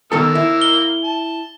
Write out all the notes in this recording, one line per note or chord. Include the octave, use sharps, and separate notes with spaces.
B2 D#3 A#3 A4 E6 F6
E4
G7
A5